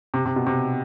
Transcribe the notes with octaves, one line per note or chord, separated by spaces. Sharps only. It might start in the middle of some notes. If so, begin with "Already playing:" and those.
C3
C3
B2
C3